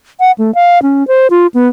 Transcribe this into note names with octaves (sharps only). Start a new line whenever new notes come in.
F#5
A3
F5
C#4
C5
F4
B3